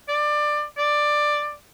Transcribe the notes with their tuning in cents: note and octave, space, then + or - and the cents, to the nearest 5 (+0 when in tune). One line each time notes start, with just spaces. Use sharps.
D5 +20
D5 +10